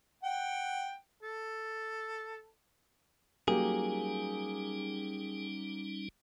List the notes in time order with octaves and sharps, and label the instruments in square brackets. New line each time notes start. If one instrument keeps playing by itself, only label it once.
[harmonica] F#5 G5
A4
[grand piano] F#3 A#3 G4 [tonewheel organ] G3 C#4 D#4 [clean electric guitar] G#4